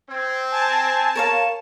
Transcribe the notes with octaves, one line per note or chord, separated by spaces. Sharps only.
C4 G#6
G#5 A5
A#4 C#5 F5 E7